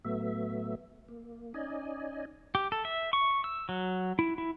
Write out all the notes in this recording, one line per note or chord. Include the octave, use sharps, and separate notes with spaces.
A2 F#3 A3 B3 E5
A#3
C#4 D#4 D5 D#5 G#5
G4
A4
E5
C#6
E6
F#3
E4
E4